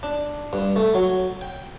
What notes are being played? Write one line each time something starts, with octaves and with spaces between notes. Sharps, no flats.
D4
G2
A3
F#3
G5